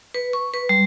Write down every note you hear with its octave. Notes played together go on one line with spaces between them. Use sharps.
B4
C#6
B4
G3